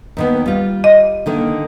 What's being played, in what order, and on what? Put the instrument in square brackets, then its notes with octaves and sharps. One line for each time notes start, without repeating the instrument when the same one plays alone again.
[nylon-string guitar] D#2 D#3 B3
G3 F4
[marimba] D#5
[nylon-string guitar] D3 D#3 A#3